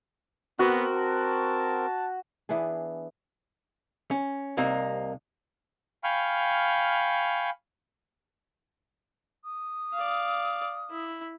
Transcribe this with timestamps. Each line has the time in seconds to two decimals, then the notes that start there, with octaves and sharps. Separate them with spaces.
0.59 B3 C4 F#4 A#4
0.96 A5
2.49 E3 B3 D4 G#4
4.11 C#4
4.57 C2 C3 A#3 D#4
6.04 F5 G5 G#5 B5 C#6 F6
9.45 D#6
9.94 D5 F5
10.90 E4